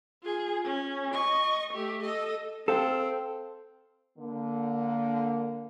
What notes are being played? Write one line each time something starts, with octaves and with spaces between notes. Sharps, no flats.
F4 G#4
C#4
D#5 C#6
A3 G4
A4 D#5
C4 A4 F5
D3 A#3